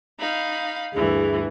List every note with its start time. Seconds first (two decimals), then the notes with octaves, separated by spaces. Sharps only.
0.20 D#4 F5 B5
0.94 D2 G2 E3 G#4